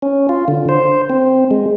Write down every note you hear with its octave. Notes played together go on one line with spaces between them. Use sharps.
C#4
F4
D3
C5
C4
G#3